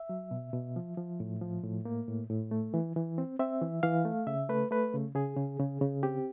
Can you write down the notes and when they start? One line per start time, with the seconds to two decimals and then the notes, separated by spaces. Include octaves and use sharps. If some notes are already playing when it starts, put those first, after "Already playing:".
Already playing: E5
0.09 F#3
0.31 B2
0.53 B2
0.76 F3
0.97 F3
1.20 A2
1.42 F3
1.64 A2
1.85 A#3
2.08 A2
2.30 A2
2.51 A3
2.74 E3
2.96 E3
3.18 C4
3.39 C4 E5
3.62 E3
3.83 E3 F5
4.05 A3
4.27 C#3 E5
4.49 A3 B4
4.71 A3 B4
4.94 C#3
5.15 C#3 G#4
5.37 C#3
5.60 C#3
5.81 C#3
6.03 C4 G4